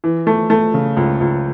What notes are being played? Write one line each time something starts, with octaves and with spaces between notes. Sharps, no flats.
E3
A3
A3
C#3
C#2
C#2